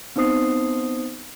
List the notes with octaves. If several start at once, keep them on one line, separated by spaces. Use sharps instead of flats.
B3 C4 D#4 C5 D#6 C7